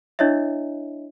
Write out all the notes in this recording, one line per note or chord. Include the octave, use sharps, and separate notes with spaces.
D4 E4 C#5 D#5 E5